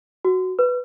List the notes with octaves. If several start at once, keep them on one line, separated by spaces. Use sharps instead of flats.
F#4
B4